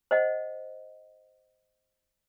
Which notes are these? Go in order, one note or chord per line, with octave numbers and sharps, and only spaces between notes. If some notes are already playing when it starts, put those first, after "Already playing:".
C5 D#5 F#5